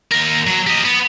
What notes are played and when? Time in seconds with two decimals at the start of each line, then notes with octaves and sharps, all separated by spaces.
0.11 D#2 A#4
0.47 F#3
0.67 G4 D#5
0.85 B3